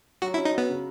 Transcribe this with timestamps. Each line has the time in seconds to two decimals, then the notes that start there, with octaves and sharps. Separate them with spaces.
0.22 F#3 F#4
0.34 E4
0.37 C#4
0.45 D#4
0.54 B3 F#4
0.69 C#3